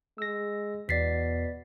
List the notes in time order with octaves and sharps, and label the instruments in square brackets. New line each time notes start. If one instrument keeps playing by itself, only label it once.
[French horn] G#3 [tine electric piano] E6 A#6
[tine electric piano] E2 C7 [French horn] B2 [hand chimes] D5 A6 B6